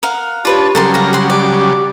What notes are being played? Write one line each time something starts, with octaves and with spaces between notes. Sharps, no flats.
A#4 F5 F#5
D4 F4 G4 B4 C#5 A5
C#3 F#3 G3 A4 A#4 C6
F5 A#5
G4 F#5 C6
G4 D5